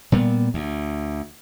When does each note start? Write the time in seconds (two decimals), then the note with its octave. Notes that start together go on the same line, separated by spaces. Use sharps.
0.12 A#2 G3 B3
0.54 D2